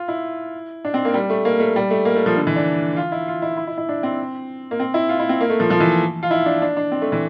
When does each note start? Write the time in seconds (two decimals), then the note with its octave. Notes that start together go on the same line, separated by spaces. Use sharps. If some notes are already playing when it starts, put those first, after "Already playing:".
Already playing: F4
0.08 E4
0.85 D4
0.94 C4
1.05 A#3
1.14 G3
1.30 A3
1.45 A#3
1.60 A3
1.76 G3
1.91 A3
2.05 A#3
2.15 A3
2.26 F3
2.37 D3
2.47 E3
2.56 D4
2.96 F4
3.12 E4
3.28 F4
3.42 E4
3.57 E4
3.67 E4
3.78 E4
3.89 D4
4.03 C4
4.71 A#3
4.80 C4
4.94 E4
5.09 F4
5.19 E4
5.29 C4
5.41 A#3
5.50 A3
5.60 F3
5.70 F3
5.80 E3
6.23 F4
6.31 E4
6.46 D4
6.62 D4
6.77 D4
6.92 C4
7.02 A3
7.12 E3